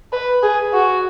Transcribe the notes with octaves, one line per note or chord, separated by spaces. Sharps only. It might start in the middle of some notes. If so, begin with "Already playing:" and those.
B4
G#4
F#4